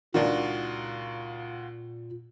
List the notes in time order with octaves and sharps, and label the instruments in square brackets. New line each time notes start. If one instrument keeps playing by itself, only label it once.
[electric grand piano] C#2 F4 F#4 [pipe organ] A#2 [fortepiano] D#3 D4